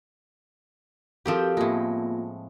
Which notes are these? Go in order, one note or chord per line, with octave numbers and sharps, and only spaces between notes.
F3 C4 F#4 G4 A4 A#4
A2 G#3 A#3 B3 F4